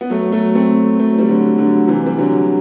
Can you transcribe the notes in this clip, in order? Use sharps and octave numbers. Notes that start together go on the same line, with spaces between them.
B3
F#3 A3
F#3 A3
A3 C4
F#3 A3
G3
D3 F#3
D3 F#3
C3 E3
G3
D3 F#3